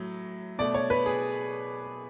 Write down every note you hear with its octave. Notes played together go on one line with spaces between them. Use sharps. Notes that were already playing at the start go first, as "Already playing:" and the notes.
Already playing: A2 F#3
B2 A3 D5
C#5
B4
G#4